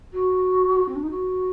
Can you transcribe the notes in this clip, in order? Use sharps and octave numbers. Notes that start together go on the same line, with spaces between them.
F#4
C4
D4
D#4
F#4